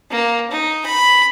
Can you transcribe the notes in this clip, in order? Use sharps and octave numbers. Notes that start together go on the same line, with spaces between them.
A#3
D#4
B5